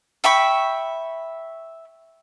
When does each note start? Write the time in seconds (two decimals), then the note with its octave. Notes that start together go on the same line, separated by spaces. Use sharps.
0.24 E5 G5 B5 C#6